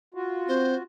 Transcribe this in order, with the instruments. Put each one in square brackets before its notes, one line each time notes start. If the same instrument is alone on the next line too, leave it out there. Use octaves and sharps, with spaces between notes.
[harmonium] F4 F#4
[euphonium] C4 [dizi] C5